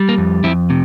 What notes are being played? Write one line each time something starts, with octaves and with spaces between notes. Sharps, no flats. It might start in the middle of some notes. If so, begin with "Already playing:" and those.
Already playing: G3
A#3
F2
F2 C4 E4
C3